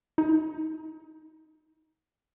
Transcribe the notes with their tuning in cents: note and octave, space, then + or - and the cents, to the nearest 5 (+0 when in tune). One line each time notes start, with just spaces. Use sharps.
D#4 +25